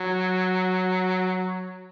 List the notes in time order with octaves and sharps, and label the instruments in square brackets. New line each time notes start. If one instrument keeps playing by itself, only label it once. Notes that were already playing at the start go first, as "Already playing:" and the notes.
Already playing: [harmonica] F#3